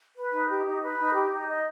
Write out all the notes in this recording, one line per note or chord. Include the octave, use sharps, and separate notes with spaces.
B4
D#4
G4
D#4
B4
D#4
G4
D#4
D#5